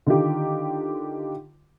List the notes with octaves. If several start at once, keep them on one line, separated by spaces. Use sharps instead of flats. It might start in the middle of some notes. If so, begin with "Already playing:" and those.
D3 D#3 D#4 F4 G4